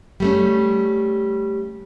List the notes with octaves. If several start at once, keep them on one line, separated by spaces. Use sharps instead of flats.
G3 A3 C#4